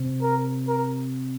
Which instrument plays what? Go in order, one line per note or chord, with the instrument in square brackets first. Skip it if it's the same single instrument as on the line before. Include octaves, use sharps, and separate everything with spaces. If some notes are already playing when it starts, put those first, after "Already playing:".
Already playing: [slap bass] C3
[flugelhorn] A#4
A#4